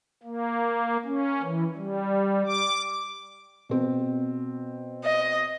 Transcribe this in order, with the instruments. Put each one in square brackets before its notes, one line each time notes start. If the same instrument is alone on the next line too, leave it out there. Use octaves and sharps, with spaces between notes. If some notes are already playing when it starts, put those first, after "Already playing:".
[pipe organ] A#3
C#4
E3
G3
D6
[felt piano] B2 C4
[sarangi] D#5